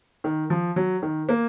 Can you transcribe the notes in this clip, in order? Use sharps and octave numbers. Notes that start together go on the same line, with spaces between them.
D#3
F3
F#3
D#3
A#3